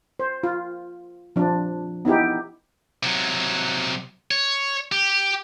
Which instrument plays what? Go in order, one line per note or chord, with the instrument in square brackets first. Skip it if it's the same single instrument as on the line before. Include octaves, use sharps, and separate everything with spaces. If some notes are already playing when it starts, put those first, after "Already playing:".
[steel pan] C5
F4
F3 D4
B3 D#4 E4 G4
[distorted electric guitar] C3 F#3
C#5
G4